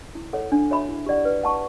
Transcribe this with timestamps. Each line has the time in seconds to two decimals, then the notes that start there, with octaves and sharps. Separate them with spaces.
0.15 E4
0.33 A4 C#5 F#5
0.52 D4
0.71 F#4 C#5 E5 B5
0.89 E4
1.06 G4 D5 F#5
1.25 B4
1.43 F#5 A5 C#6